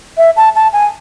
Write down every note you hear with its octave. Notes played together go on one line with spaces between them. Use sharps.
E5
A5
A5
G#5